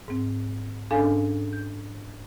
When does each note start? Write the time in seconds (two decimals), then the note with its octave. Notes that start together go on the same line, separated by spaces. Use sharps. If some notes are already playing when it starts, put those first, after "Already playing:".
0.08 G#2 C4
0.91 G#2 C#4 D4 A4 F5 G#5
1.53 G6